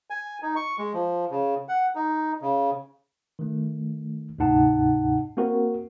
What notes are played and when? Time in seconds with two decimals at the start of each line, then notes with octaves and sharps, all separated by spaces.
0.10 G#5
0.43 D#4
0.56 C#6
0.78 G#3
0.93 F3
1.31 C#3
1.69 F#5
1.95 D#4
2.42 C#3
3.39 D#3 A3
4.38 D2 G#2 C3 D#4 F#5 A5
5.37 A#3 C4 F#4 A#4